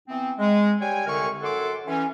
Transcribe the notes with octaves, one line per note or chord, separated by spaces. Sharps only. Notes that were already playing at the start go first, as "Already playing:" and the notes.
E3 B3 C4
G#3
G3 C#5 G5 G#5
C2 D3 A#4 G#5 C#6
F#2 A4 F#5 C6 D6
E3 C#4